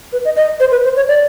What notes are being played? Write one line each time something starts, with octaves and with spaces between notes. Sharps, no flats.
B4
D#5
D#5
C5
B4
C5
C#5
D5